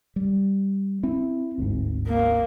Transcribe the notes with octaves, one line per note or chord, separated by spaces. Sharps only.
G3
C4 E4
G1 D2 G#2
A#3